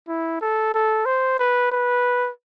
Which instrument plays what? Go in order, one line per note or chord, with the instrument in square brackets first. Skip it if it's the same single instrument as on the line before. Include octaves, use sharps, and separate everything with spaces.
[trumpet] E4
A4
A4
C5
B4
B4